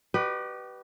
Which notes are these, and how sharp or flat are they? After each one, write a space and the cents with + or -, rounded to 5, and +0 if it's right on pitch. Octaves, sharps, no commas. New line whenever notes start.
G4 -35 B4 +0 D5 +45